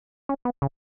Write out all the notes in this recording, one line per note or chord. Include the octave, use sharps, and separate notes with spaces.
C#4
B3
C#3